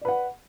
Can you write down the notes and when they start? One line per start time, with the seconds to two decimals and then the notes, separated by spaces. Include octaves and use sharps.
0.01 D5
0.05 B4
0.08 F#5